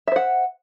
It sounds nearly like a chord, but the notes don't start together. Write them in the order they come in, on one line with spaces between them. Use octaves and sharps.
E5 C5 F#5